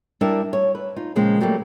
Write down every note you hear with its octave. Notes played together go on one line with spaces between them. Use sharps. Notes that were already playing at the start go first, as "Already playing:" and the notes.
G3 D4 E4 A#4 D5 E5
C#5
B4
D#4 F4
A#2 C#3 F3 G#3 C4
F#3 G3 A3 A#3